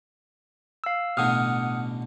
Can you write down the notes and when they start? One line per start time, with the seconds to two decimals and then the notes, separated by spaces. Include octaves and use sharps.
0.84 F5 E6
1.17 A1 B2 D3 F#5 D#6 F6